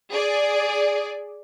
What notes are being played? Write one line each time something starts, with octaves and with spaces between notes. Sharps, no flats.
G#4 D5